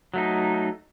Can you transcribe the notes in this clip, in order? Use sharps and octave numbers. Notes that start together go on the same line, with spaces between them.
F#3 A3 D#4